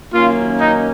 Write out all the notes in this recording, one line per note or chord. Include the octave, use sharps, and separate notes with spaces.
F#2 D#3 A#3 C#4 F4
D#4